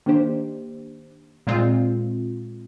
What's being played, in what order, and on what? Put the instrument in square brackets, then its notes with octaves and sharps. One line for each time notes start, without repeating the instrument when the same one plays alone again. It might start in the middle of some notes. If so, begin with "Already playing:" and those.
[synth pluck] D#3 A#3 D4 G4 C5
A#2 G#3 C4 F4